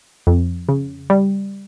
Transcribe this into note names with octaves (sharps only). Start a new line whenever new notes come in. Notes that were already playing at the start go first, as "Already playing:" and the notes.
F2
C#3
G3